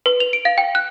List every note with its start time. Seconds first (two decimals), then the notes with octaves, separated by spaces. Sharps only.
0.06 B4
0.20 F7
0.33 D7
0.45 F5
0.58 G5
0.75 F#6